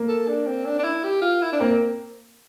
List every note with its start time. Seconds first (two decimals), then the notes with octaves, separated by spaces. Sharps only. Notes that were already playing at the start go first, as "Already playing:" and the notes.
Already playing: A#3
0.08 A4
0.28 D4
0.47 C4
0.65 D4
0.79 D4
0.84 E4
1.04 G4
1.22 F4
1.42 E4
1.52 D4
1.60 A#3 C4